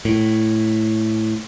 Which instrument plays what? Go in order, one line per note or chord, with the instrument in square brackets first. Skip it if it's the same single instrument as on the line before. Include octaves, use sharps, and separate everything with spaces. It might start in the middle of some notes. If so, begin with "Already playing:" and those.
[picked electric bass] A2